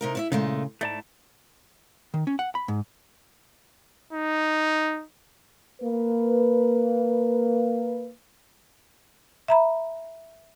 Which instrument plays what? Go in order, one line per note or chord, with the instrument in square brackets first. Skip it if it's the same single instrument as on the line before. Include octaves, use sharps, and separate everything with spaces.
[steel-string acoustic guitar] C3 D#4 A#4
E4 C#5 E5
[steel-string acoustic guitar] A#2 G#3 A3 [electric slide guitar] C#3
[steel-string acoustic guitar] G#2 [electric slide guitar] A3 D5 A5
[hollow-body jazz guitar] D#3
C#4
F#5
B5
G#2
[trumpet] D#4
[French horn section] A#3 B4
[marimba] E5 A#5 B5